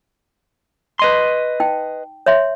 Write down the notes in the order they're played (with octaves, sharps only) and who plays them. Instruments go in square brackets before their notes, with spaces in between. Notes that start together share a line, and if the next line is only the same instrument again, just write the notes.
[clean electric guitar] B4 D#5 C6
[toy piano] D#4 G5
C#5 E5 C6